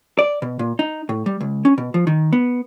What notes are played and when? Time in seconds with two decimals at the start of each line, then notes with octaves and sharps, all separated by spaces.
0.19 D5
0.42 B2
0.59 A#2
0.79 D#4
1.09 A2
1.26 G3
1.41 C#2
1.65 C#4
1.78 B2
1.94 F3
2.07 D#3
2.33 B3